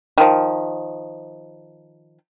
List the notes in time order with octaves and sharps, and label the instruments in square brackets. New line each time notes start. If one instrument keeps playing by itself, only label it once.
[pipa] D#3 F3